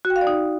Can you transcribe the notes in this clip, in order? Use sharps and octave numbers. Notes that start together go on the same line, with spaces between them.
F#4
G5
F5
D5
D#4